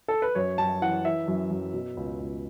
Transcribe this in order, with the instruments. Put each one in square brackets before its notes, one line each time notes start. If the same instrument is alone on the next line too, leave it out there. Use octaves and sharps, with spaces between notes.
[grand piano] A4
B4
F#2 C#5
F#2 A5
E3 F#5
E3 E5
F#2
F#2
B2
C#2
C#2